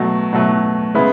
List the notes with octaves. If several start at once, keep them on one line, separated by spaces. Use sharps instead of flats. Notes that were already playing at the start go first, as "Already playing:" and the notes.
Already playing: B2 F#3 A3
B2 F#3 A3
C#3 G#3 B3 E4